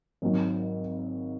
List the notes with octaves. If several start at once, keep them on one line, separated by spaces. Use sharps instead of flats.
G#1 G#2 F#3